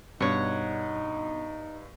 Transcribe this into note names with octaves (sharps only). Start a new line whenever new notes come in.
G2 B2 D4 D#4 C#5 F#5